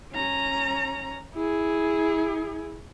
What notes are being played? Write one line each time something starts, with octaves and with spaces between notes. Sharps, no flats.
C#4 A#5
E4 G#4